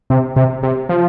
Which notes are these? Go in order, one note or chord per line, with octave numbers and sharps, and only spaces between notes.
C3
C3
C3
F3